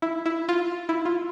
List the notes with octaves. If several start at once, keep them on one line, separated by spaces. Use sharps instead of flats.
E4
E4
F4
E4
F4